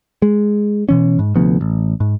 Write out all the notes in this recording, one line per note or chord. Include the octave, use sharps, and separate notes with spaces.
G#3
B2 E3 C#4
G#2
D2 C3 F3 B3
A1
G#2